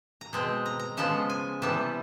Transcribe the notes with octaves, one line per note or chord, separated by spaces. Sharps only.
A#5
B2 G#3 C4 A5
A#5
A#5
C#3 F3 G#3 B3 A5
G#5
C3 E3 G3 B3 A5